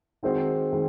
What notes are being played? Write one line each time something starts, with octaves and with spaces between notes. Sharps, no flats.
D#3 G#3 C4 F#4 C5
D#3 G#3